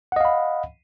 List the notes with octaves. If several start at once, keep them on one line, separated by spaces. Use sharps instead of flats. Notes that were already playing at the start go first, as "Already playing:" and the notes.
D#5 F5 F#5 B5